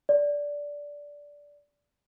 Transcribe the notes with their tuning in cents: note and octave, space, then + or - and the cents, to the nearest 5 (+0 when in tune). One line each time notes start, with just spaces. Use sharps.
D5 -10